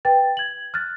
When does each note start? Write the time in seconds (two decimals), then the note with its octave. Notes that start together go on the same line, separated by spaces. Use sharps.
0.05 B4 G5 A6
0.37 G#6 F#7
0.74 F6 F#6 A6